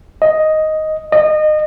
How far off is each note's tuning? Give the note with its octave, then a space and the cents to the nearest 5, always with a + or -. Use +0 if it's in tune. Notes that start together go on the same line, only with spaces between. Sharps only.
D#5 +5
D#5 -25